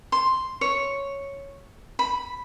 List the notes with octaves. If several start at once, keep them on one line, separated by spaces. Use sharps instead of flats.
C6
C#5
B5